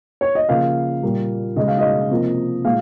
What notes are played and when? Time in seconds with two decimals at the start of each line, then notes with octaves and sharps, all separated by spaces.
0.21 C#5
0.35 D#5
0.49 C#3 F3 A#3 F5
1.03 A#2 G3 A#3
1.56 C#3 G#3 D#5
1.68 F5
1.78 D#5
2.11 C3 F3 A#3
2.65 A#2 G#3 F5